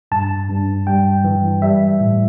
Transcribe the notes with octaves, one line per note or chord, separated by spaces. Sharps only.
G2 A5
G2
G3 G5
E3
G3 E5
A2